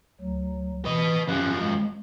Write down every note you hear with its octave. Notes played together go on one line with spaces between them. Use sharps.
D2 F#3
E3 B4 D#5
F#2 F3 C#4 G4 F#6
G#3